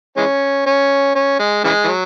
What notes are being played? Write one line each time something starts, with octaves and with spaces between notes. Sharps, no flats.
E3 G#3 C#4
C#4
C#4
G#3
C#3 E3 G#3
E3
F#3